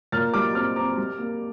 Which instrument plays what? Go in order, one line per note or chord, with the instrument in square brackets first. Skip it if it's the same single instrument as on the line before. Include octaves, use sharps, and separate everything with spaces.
[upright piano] A#2 F6 A6
G3 D6 F6
C4 D6 F6
C4 A#5 D6
G3
A#3